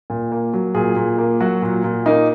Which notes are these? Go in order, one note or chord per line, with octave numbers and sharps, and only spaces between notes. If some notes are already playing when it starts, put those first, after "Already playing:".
A#2
A#3
F#3
A#2 G#4
A#2
A#3
F#3 F#4
A#2
A#2
A#3 D#4